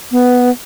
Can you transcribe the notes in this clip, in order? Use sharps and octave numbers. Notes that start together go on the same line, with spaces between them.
B3